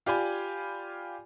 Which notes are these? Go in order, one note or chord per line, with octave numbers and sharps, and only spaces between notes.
F4 G4 D5 G#5 B5